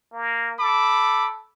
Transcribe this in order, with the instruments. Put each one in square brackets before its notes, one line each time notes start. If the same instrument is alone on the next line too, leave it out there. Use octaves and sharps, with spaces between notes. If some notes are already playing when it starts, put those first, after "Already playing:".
[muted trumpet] A#3
[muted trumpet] A4 [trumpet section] B5 D6